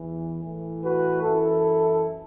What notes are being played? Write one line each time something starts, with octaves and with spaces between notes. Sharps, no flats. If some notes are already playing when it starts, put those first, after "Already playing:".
Already playing: E2 E3
A2 E3
F#4 B4
F#2 E3 E4 A4